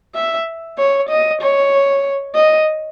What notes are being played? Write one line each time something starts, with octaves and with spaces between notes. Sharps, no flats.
E5
C#5
D#5
C#5
D#5